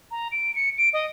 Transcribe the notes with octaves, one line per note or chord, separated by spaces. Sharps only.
A#5
D7
C#7
D7
D#5